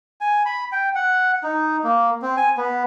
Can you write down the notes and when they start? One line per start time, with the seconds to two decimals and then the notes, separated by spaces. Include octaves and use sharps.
0.21 G#5
0.45 B5
0.72 G5
0.95 F#5
1.43 D#4
1.84 A#3
2.22 C4
2.37 G#5
2.58 B3